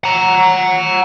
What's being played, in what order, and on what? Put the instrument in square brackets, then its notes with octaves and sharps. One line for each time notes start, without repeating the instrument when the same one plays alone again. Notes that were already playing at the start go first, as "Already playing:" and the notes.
[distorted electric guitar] F#5 A#5